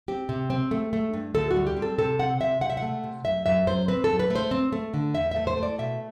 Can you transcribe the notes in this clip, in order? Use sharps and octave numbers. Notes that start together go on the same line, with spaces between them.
C4 G4
C3
C4
A3
A3
G2
D2 A4
F#4
G3
G4
C4
A4
C3 A4
C4 F#5
C3 E5
C3 F#5
E5
F#5
A3
C3
F#2 E5
F#2 E5
F#2 C5
C4 B4
A4
F#2
B4
A3
C5
C4
A3
D3
E2 E5
A3 E5
C5
A3
D5
B2 E5